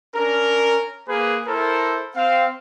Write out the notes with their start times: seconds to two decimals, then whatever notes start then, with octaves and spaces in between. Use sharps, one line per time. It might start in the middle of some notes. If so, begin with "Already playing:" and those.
0.15 C#4 D4 A#4
1.07 A#3 G#4 B4
1.46 E4 A4 A#4 C5
2.16 C4 F5